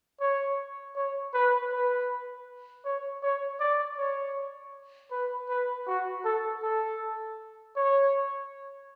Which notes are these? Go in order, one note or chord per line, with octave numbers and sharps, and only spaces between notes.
C#5
C#5
B4
B4
C#5
C#5
D5
C#5
B4
B4
F#4
A4
A4
C#5